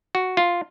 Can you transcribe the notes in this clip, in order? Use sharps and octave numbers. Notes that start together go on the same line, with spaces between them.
F#4
F4